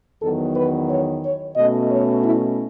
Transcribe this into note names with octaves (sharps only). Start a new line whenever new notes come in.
E2 D#3 F#3 B3 A4
B4
C#5
C#5
B2 A3 C#4 D#5
C#5
E4